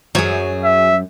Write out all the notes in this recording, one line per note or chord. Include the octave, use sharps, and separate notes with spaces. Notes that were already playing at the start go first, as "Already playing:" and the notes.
F#2 F#3 G#4 C#5
E5